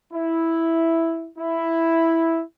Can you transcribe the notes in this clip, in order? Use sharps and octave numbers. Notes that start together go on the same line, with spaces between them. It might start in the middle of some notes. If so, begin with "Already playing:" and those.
E4
E4